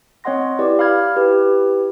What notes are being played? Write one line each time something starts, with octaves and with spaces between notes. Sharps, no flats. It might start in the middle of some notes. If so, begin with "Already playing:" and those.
C4 C#5 D#5 F#5 C6 A#6
E4 G4 B4 D5
F5 B5 F6 G#6
E4 G4 B4